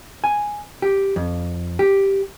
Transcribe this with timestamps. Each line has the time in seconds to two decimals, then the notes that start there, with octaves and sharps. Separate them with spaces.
0.24 G#5
0.82 G4
1.16 F2
1.79 G4